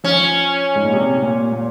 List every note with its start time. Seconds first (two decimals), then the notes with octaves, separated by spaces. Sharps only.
0.04 F3 C#4
0.75 G#2
0.84 A#2
0.93 C3
1.22 A#2
1.52 A#2